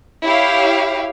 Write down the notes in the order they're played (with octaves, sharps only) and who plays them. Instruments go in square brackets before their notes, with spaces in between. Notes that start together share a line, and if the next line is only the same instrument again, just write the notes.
[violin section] E4 G4 C#5 F5